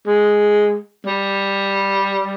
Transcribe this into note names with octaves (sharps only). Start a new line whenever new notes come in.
G#3
G3